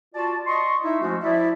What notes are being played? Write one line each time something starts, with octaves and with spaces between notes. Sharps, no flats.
F4 F#4 D5 A5
D#5 C6 C#6
D#4 E4 E5
F3 G#3 A3 C#4 F#4
F3 E4 D5 E5